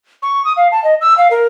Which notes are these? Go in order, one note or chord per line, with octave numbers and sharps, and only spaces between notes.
C#6
D#6
F5
A5
D#5
E6
F5
A#4